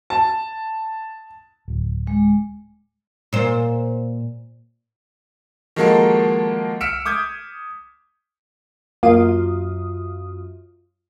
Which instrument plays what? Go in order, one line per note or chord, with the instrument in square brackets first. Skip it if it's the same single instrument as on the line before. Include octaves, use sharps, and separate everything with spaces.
[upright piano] A5
[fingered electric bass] D1
[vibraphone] G#3
[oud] A#2 C5
[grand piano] D#3 F3 G#3 A#3 F#4 A4
E6 F6 B6 C#7 D7 E7
D6 D#6 G6 G#6
[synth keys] F#2 F4 D#6 [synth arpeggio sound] A#3